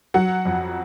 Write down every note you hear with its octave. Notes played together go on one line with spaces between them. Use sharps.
F#3 F#5
F2